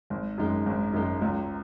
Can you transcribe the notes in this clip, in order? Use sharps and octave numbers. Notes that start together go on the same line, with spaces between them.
G#1
F#2 D#3 G#3
G#1
F#2 D#3 G#3
C#2